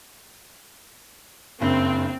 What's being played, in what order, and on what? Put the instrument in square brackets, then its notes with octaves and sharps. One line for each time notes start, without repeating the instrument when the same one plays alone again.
[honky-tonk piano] F#1 G2 [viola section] C4